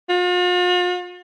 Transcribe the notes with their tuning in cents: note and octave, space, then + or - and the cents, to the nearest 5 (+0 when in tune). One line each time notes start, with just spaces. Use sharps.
F4 +45